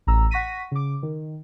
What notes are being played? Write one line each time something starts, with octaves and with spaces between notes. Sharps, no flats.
A1 A#5 E6
F#5 C#6 A#6 B6 D#7
C#3 D6
D#3